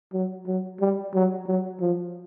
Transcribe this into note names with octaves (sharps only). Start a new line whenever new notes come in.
F#3
F#3
G3
F#3
F#3
F3